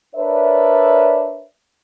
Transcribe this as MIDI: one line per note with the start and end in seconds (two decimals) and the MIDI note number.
0.16 1.47 62
0.16 1.47 70
0.16 1.47 71
0.16 1.47 73
0.16 1.47 74
0.16 1.47 76